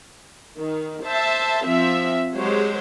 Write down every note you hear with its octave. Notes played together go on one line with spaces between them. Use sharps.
D#3
C5 E5 A5
F3 C4 E5
F#3 G#3 G4 C5 C#5